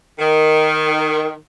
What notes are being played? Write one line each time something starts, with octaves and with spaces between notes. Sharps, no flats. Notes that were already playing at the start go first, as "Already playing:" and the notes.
D#3